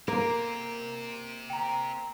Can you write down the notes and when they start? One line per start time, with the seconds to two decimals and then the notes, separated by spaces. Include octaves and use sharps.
0.08 A#3 C4 G4 A#4
1.50 G5 A#5